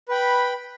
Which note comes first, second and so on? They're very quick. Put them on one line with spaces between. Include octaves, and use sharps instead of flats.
B4 G5 B5